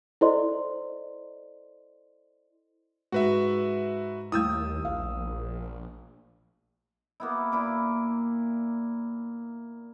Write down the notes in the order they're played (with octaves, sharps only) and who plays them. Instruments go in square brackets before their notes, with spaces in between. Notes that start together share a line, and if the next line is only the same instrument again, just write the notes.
[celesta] E4 A4 C5 D5 D#5 C6
[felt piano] G#2 [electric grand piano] F#4 B4 E5
[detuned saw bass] D#2 [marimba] G3 A3 E4 [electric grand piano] D#6 E6
[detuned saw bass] A#1 [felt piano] F5
[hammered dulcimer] A#3 B3 E4
A#2 E4 D6